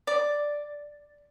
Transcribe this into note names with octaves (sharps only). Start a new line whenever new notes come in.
D5